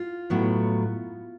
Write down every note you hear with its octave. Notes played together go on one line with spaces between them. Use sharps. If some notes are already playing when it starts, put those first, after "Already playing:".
Already playing: F4
A2 F#3 B3